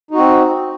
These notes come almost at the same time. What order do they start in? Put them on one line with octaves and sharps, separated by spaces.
D#4 F#4 C4